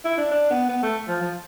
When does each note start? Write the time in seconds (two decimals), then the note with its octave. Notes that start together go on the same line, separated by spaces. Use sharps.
0.05 E4
0.17 D4
0.31 D4
0.50 B3
0.69 B3
0.83 A3
1.08 F3
1.21 F3